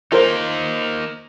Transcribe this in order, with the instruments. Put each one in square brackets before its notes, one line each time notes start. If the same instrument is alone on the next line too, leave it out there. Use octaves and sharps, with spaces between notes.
[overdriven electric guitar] A#3 D#4 [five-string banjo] F4 A#4 C5